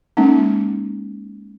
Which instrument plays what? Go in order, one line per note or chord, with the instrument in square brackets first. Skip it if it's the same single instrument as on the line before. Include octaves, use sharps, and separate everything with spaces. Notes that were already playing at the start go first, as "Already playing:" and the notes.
[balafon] G#3 A#3 C#4 D#4